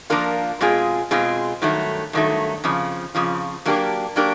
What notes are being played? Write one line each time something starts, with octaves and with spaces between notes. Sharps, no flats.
F3 A#3 D4 F4 A#4
B2 G#3 C4 F4 G#4
B2 G#3 C4 F4 G#4
G2 D#3 F#3 A3
G2 D#3 F#3 A3
F2 C#3 F3
F2 C#3 F3
F#3 A#3 D4 G4 A#4
F#3 A#3 D4 G4 A#4